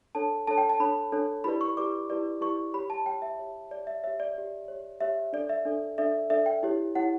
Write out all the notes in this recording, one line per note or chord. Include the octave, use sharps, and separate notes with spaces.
D4 A4 C#5 A5
D4 A4 C#5 A5
G5
A5
D4 A4 C#5 B5
D4 A4 C#5
E4 G4 B4 D5 B5
C#6
E4 G4 B4 D5 D6
E4 G4 B4 D5
E4 G4 B4 D5 C#6
G4 C#5 B5
A5
G4 C#5 G5
E5
G4 C#5
G4 C#5 D5
E5
G4 C#5 E5
D5
G4 C#5
G4 C#5
G4 C#5 E5
D4 A4 D5
E5
D4 A4 D5
D4 A4 D5 E5
D4 A4 D5 E5
G5
E4 G4 C#5
E4 G4 C#5 F#5